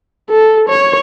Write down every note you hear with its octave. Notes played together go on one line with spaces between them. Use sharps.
A4
C#5